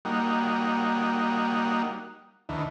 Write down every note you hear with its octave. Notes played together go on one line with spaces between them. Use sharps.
G3 A#3 D#4 F#4
D2 D#3 E3